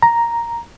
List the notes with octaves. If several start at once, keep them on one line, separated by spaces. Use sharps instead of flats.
A#5